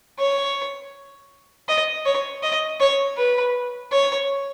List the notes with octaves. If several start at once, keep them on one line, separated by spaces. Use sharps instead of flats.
C#5
D#5
C#5
D#5
C#5
B4
C#5